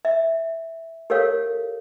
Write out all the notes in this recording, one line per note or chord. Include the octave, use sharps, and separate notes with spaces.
E5
G4 A4 A#4 C#5 F5